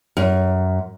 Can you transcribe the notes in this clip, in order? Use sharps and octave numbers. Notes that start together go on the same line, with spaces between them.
F#2